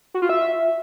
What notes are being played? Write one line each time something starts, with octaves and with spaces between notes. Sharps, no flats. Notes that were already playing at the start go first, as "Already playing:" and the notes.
F#4
F4
E5